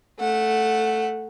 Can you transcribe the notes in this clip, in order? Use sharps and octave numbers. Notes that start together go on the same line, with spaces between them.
A3 F#5